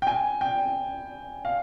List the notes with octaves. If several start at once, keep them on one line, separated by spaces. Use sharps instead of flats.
G5
G#5
G5
F5